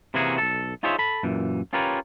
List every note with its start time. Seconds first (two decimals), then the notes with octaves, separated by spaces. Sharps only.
0.14 C3 E3 A#3 C#4 F#4 G#4
0.38 B1 A4
0.83 D#4 F4 G#4 C5 C#5 E5
0.99 A4 B5
1.23 F#2 A#2 E3
1.73 C#4 F4 G4 A#4 B4 C#5